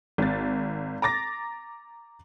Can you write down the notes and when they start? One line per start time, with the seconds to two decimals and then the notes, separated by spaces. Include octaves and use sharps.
0.18 G#1 A6
1.02 A#5 D6 A6 A#6